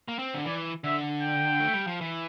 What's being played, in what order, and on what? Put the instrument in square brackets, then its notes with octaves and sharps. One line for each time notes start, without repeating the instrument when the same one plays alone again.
[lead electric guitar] A#3
C4
D3
[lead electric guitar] E3 [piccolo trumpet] D5
[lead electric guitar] D3 [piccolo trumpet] E5
[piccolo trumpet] G5
[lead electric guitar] A3
G3
F3
E3